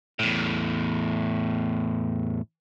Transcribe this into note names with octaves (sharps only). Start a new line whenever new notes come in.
E2 A2